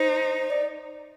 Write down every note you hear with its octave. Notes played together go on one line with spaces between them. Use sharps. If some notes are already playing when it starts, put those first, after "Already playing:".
Already playing: D#4 C5
D5